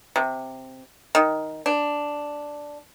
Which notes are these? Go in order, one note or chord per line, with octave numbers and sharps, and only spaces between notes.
C3
D#3
D4